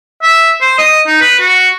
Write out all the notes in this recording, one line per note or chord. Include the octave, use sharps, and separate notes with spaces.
E5
C5
D#5
D#4
B4
F#4